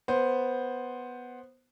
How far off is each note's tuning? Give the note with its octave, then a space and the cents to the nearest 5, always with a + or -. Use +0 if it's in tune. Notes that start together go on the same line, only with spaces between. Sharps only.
B3 +0 C5 +5